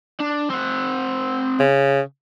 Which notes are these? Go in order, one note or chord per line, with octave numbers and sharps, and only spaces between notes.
D4
C4 F#5
C#3